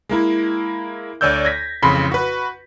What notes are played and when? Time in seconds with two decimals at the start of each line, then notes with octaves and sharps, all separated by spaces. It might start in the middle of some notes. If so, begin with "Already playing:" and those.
0.09 G#3 A#3 E4
1.21 D2 C#5 D5 E6 G6
1.45 G#6 A#6 B6
1.83 A1 F2 C#3 B5 C6 B6
2.12 F#4 B4